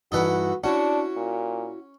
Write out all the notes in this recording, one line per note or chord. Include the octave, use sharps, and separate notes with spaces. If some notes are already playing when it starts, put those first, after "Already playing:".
G2 E3 D#4 F#4 A4 B4 F#5
C#4 D4 E4 F#4 F#5
A#2